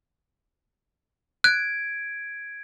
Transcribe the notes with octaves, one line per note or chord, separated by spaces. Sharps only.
F#6 G#6 D7